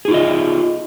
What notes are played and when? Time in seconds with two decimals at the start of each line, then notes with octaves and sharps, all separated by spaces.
0.05 G#4
0.08 D#4
0.11 F4
0.14 D#5